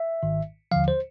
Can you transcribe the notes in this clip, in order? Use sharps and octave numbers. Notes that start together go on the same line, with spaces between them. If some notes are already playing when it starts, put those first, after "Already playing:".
Already playing: E5
G#1 G#2 D#3
D#2 D3 F3 F5
C5